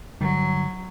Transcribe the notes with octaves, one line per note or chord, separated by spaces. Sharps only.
G1 D3 F#3 G3